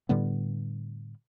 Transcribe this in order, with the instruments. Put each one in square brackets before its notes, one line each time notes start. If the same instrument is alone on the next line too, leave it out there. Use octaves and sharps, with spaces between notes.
[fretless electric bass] A2 D3 G3 B3